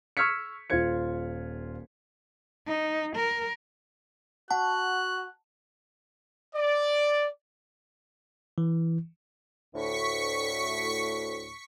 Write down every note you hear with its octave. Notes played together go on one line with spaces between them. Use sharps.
C#6 E6 F6 G#6 B6 C#7
D#1 F4 C5 G#6 C#7
D#4
A#4
F#4 F#5 A5 F#6
D5
E3
D2 A2 C#6 B6 C#7